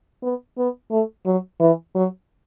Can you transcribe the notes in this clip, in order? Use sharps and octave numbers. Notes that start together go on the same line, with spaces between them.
B3
B3
A3
F#3
E3
F#3